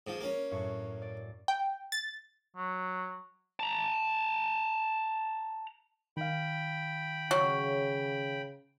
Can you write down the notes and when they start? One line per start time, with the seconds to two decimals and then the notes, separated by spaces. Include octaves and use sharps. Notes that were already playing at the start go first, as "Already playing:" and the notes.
0.07 G#2 F3
0.21 A#3 C#4
0.51 F#2 A2 C#6
1.02 D5
1.48 G5
1.92 A6
2.56 F#3
3.60 A5 A#5
6.17 D#3 F5 G5 B5
7.31 C#3 F#3